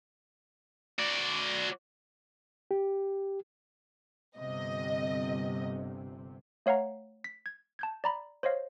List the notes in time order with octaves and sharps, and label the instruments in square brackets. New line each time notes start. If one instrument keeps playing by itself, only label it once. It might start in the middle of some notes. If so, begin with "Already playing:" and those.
[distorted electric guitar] F#4 D5
[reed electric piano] G4
[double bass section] G1 C3 [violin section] D#5
[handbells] A3 C#5 F5 F#5 A#5
B6
G#6
A5 G6 G#6
D5 A#5 B5
C5 C#5 D#5 F5